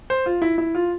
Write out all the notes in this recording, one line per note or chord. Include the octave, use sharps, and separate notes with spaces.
C5
F4
E4
E4
F4